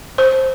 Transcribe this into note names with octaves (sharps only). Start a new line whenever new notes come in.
C5